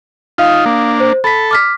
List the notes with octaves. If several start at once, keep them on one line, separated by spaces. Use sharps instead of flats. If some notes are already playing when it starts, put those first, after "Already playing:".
D#4 F4 F5 D#6
A#3 D4
C5
A4 B5 B6
D6 F6 B6